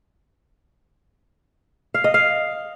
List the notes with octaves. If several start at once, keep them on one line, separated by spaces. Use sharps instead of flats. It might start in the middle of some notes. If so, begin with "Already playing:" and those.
F5
D#5
F5